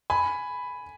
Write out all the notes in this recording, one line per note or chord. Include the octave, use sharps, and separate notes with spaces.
G#5 B5